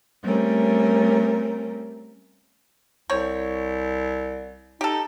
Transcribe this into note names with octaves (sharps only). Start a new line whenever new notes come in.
G3 A3 C4 C#4 A#4
C2 C4 C#5
D#4 G4 A4